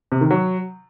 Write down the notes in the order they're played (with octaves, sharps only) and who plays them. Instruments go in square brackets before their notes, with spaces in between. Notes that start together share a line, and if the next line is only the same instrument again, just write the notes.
[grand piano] C3
D#3
F#3